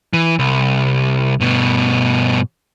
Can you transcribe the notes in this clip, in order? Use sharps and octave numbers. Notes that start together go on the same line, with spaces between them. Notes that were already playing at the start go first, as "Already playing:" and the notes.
E3
C2
G2 B2